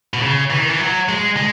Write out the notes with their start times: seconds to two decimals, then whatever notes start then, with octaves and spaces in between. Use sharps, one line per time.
0.14 B2
0.22 C#3
0.50 E3
0.60 D#3
0.69 E3
0.79 F#3
1.09 G#3
1.37 G#3